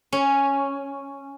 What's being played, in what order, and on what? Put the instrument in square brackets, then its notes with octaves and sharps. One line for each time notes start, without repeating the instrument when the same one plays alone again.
[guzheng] C#4